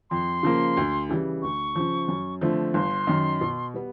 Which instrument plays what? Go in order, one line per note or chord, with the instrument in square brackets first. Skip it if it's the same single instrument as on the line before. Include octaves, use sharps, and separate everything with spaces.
[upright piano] F2 [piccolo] C6
[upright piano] C#3 F3 A#3
D2
C#3 E3 G3
[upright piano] D2 [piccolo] C#6
[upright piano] C#3 F3
F#2
D3 F3 A3 C4
[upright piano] G1 [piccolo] C6
[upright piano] F#2 D#3
B2
G3 B3